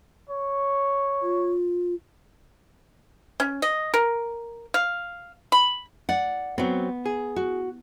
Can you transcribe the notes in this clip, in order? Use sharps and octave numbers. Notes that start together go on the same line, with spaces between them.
C#5
F4
C#4
D#5
A#4
F5
B5
D5 F#5
F#3 B3 C4
G#4
F#4